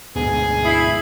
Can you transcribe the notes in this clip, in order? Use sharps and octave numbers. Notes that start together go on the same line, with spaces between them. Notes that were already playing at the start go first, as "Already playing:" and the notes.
D2 G#2 B2 G#4
E4 D#6 C7 F#7